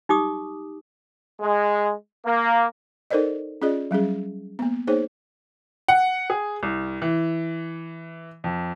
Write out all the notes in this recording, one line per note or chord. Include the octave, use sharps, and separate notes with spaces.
D#4 G4 D6 D#6
G#3
A#3
D#4 A4 A#4 C5 D5 D#5
C#4 F4 G#4 D5 D#5
F#3 G3 C#4 G#4
A#3 B3
A#3 D#4 G#4 C5 C#5
F#5
G#4
C2
E3
F2